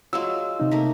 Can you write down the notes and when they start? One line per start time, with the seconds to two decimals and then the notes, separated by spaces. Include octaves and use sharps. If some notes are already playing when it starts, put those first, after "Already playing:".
0.13 F#3 G#3 F4 E6
0.60 C3 D#4
0.71 A3 A#3 A#4